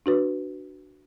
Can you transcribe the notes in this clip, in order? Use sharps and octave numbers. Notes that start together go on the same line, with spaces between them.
D4 F#4 B4